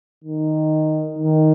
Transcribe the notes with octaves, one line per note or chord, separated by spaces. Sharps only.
D#3
D#3